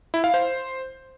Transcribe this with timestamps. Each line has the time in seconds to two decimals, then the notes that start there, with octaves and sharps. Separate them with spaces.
0.14 E4
0.24 F5
0.34 C5